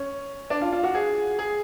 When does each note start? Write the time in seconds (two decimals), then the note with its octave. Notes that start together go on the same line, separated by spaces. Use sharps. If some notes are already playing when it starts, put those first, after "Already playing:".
Already playing: C#4
0.50 D4
0.61 F4
0.73 F4
0.84 F#4
0.95 G#4
1.39 G#4